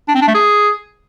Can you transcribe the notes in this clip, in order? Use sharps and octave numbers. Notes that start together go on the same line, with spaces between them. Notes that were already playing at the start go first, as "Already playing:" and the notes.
D4
C4
D4
A3
G#4